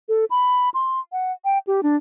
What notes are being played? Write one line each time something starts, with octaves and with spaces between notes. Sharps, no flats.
A4
B5
C6
F#5
G5
G4
D4